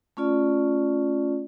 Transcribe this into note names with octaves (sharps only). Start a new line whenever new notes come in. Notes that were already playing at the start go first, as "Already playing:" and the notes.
A3 C#4 F4 D5